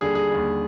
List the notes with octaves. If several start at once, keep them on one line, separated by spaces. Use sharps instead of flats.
D#2 D3 G3 G#4
G#4
D#2 D3 G3